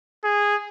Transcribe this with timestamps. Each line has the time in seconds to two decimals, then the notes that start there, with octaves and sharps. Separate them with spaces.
0.24 G#4